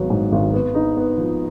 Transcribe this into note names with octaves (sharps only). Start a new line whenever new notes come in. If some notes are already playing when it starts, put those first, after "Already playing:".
Already playing: G#1 F#3 B3
G#2
G#1
B3
D#4
B3
F3